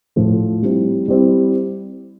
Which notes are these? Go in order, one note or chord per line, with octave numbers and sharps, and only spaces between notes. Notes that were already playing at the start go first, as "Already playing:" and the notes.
A2 F3 A3
G3 C4 E4
G3 C4 E4